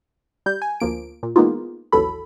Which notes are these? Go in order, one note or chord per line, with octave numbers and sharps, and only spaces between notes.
G3 G6
G#5
D2 F3 A#3 D7
A#2
E3 G#3 A#3 B3 D#4 F4
A1 D#2 E3 F#3 A4 B5